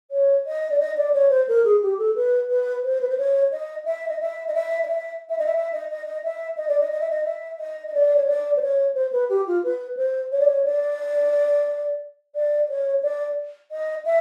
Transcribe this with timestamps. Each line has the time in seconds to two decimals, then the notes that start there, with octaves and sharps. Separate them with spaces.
0.11 C#5
0.46 D#5
0.70 D5
0.79 D#5
0.97 D5
1.13 C#5
1.30 C5
1.48 A#4
1.64 G#4
1.82 G4
1.98 A4
2.15 B4
2.49 B4
2.83 C5
3.01 B4
3.09 C5
3.18 C#5
3.51 D#5
3.85 E5
4.08 D#5
4.20 E5
4.47 D#5
4.54 E5
4.83 D#5
4.87 E5
5.29 E5
5.38 D#5
5.46 E5
5.56 E5
5.72 D#5
5.90 D#5
6.06 D#5
6.23 E5
6.57 D#5
6.68 D5
6.80 D#5
6.91 D#5
7.00 E5
7.09 D#5
7.25 E5
7.59 D#5
7.87 D#5
7.94 D5
8.16 C#5
8.26 D5
8.56 C5
8.61 C#5
8.94 C5
9.12 B4
9.29 G4
9.47 F4
9.63 B4
9.96 C5
10.32 C#5
10.39 D5
10.47 C#5
10.65 D5
12.35 D5
12.69 C#5
13.02 D5
13.71 D#5
14.05 E5